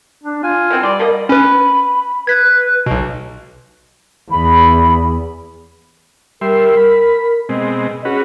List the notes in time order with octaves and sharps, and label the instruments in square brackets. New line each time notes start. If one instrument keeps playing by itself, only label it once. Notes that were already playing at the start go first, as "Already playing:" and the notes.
[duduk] D4
[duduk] F4 [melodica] G#5
[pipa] E3 C4
[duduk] G3 [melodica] D5 [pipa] C6
[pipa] B2 A#3 D#5
[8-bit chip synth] C#4 B4 [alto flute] B5
[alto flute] B4 [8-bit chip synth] G#6 B6
[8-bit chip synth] B1 B2
[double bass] E2 [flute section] B5
[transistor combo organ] G3 E5 C6 [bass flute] A#4
[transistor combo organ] B5
[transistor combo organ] B2 G#3 C4 [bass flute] D#5
[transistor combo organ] C#4 F#4 B4 [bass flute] G#4